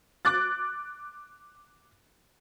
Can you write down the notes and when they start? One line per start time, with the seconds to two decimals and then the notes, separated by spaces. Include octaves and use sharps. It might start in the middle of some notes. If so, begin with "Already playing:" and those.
0.25 D6 F#6 A6